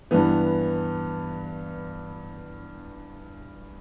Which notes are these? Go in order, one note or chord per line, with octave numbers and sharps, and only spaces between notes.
G2 E3 B3